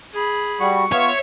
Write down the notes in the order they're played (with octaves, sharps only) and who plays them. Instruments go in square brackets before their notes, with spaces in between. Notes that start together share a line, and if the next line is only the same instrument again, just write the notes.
[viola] G#4 B5
[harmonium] G3 F#4 [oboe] C#6
[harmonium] B3 F4 [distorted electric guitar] C#5 [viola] E5